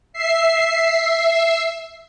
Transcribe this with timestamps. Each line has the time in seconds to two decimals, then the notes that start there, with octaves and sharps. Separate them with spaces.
0.13 E5 C7